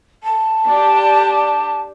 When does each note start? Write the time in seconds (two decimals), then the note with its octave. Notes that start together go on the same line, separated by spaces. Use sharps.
0.23 A5
0.67 D4 G4